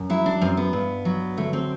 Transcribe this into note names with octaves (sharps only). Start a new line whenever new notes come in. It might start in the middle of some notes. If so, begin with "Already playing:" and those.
Already playing: F#2
F#3 E4
D4
F#2 C4
B3
G2
F#3
D3 A3
C4